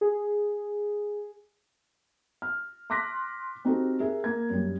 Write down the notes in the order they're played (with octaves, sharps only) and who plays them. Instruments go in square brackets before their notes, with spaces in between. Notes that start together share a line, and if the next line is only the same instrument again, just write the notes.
[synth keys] G#4
[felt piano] F6
C6 D6 F#6 A#6 B6
C4 D#4 F#4 G4 A4
G#4 A#4 E5
A#3 A#4 G#6
F#2 G3